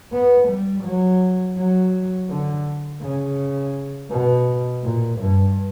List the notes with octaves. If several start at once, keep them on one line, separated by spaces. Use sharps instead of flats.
B3
G3
F#3
F#3
D3
C#3
B2
A#2
G2